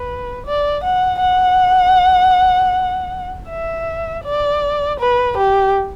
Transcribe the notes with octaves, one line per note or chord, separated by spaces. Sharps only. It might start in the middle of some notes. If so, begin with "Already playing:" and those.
Already playing: B4
D5
F#5
F#5
E5
D5
B4
G4